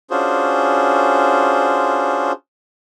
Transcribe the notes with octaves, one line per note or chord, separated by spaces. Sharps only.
C#4 D4 F4 F#4 G#4 C5